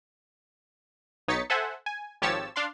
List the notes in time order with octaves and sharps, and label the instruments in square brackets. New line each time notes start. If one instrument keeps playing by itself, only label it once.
[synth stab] B1 D#4 C#5 A6 B6 C#7
A4 C5 E5 F#5 G#5
G#5
G#1 F3 G4 C#5 A5 E6
D4 F5 C6